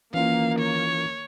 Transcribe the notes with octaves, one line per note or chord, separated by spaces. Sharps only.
D#3 E3 A#3 C#4 F4 F5
C#5